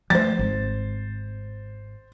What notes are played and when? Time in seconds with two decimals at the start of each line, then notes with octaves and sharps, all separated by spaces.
0.10 F3 G3 A3 C5 A6
0.39 G#1